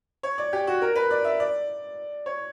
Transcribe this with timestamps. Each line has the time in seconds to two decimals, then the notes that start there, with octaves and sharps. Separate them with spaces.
0.23 C#5
0.38 D5
0.53 G4
0.67 F#4
0.82 A#4
0.95 B4
1.11 D5
1.25 E5
1.40 D5
2.26 C#5